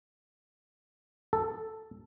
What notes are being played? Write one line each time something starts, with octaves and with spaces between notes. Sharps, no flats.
A4